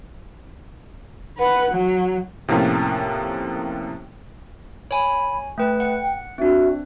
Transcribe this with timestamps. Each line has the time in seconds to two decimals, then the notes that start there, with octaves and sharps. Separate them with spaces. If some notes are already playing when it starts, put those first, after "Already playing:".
1.37 B4 F#5
1.71 F#3
2.48 A2 C3 F3 A#3 C#4 F4
4.91 C#5 G#5 B5
5.58 A3 B4 G5
5.80 F#5
6.38 C4 D4 F#4 E5